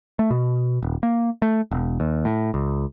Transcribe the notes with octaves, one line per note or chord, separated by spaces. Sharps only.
A3
B2
D#1
A#3
A3
E1
D#2
A2
C#2